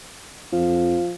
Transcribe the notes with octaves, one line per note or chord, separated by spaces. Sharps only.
F2 F3